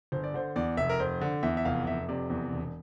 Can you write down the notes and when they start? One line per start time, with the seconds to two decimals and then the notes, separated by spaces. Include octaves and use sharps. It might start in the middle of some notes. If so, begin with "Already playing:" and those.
0.12 G1 C5
0.24 D5
0.34 D3 C5
0.56 E2 D5
0.77 F1 E5
0.89 A#4
0.99 F1 C5
1.21 D3
1.43 E2 E5
1.57 E5
1.65 F1 F5
1.87 F1 E5
2.09 C3 D5
2.30 E2
2.52 E1